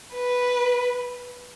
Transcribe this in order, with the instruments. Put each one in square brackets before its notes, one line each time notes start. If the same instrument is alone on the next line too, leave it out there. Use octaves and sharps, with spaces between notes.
[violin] B4